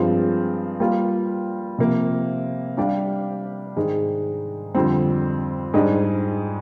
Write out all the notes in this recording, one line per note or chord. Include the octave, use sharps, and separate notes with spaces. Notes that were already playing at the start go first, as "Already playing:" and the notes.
Already playing: G2 F3 G#3 C4 F4
G3 A#3 F4
C3 F3 A#3
G3 D4 G4 D5 F5
G#2 D#3 G#3 D#4
F2 D3 G3 C4
G#2 G3 D4 G#4 D#5